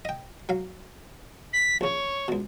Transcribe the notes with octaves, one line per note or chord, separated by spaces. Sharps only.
D#5 G5
F#3 F5
B6
A#1 C#3 C#5
C#2 B2